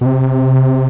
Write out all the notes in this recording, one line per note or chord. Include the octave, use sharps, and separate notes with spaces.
B2
C3